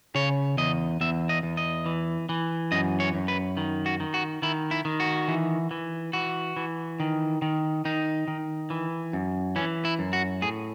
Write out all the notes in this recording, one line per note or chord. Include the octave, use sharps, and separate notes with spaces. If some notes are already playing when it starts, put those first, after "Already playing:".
C#3 C#5
E2 D#5
E2 E5
D#5
E2
D#5
E3
E3
F#2 D#5
C#5
F#2
B4
D#3
F#4
D#3
F#4
D#3 E4
E4
D#3
F#4
E3
E3
E3 F#4
E3
D#3
D#3
D#3 D#4
D#3
E3
F#2
E3 C#4
E4
F#2
F#4
A2 G#4